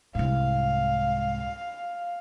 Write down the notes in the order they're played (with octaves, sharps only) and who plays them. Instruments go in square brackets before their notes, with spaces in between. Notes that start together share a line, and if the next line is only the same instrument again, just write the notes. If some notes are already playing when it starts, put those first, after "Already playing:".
[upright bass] C2 G#2 [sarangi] F5